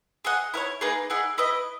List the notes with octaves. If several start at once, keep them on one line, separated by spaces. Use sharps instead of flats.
G#4 D#5 F#5
E4 A#4 C#5
A#3 D#4 G#4 B4
E4 G#4 D#5 F#5
E4 B4 D#5